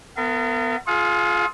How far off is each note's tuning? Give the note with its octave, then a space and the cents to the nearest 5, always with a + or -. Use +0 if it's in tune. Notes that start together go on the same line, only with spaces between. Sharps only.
B3 +15 A#4 -40 F5 -45
F4 +0 G#4 +30 F#5 -45